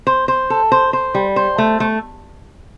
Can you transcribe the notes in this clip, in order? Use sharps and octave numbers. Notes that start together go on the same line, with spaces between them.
C5
C5
A4
C5
C5
G3
C5
A3
A3